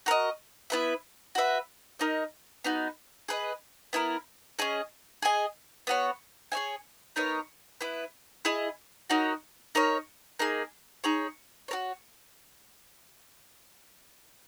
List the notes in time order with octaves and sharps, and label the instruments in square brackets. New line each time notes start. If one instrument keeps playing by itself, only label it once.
[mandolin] F#4 A#4 D#5
B3 E4 B4 E5
F#4 B4 E5
D#4 A#4 D#5
B3 D#4 F#4
G#4 B4 D#5
B3 E4 A#4
C#4 G#4 D#5
G#4 D#5 G#5
B3 F#4 C#5
G#4 C#5 E5 G#5
B3 D#4 A#4 C#5
B3 E4 B4
E4 G#4 D#5
D#4 F#4 A#4 C#5
D#4 A#4 C#5
A#3 D#4 G#4
D#4 G#4 C#5
F#4 A#4 C#5